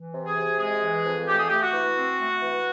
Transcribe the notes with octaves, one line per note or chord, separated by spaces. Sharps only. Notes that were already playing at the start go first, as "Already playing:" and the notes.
Already playing: E3
C3
G#4
C3
G#3 G#4
E3
F2
A3 G4
G#4
A3 G4
F#4
E3
C4
A3
E3